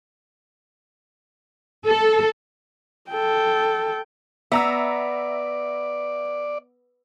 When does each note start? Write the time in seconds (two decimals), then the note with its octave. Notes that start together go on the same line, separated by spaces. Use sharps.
1.86 A4
3.11 A4 G5
4.52 B3 D5 E5 A#5 E6